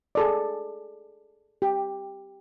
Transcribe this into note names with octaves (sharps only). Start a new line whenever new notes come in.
G#4 A4 D5
G4